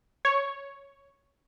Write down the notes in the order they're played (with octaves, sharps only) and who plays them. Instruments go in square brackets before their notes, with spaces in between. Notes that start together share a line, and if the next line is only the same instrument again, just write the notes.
[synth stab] C#5